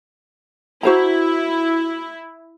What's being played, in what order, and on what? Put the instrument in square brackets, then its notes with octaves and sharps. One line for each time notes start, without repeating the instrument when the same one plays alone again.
[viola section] E4 [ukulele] F#4 C5 A#5